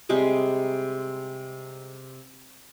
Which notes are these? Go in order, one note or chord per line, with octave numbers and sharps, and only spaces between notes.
C3 G3 G#3 D#5